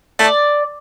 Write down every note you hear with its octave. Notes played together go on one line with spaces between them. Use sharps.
A3 D5